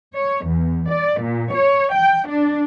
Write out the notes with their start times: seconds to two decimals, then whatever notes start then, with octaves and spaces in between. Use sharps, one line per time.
0.14 C#5
0.46 E2
0.88 D5
1.20 A#2
1.52 C#5
1.93 G5
2.29 D4